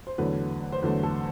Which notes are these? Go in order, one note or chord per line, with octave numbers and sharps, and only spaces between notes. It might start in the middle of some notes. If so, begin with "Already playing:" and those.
C5
E2 D3 F#3 A3 B4
C5
E2 D3 F#3 A3 B4
A4